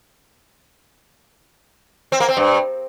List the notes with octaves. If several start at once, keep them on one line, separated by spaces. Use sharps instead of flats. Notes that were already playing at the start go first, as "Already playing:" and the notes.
C4
A#3
C4
G2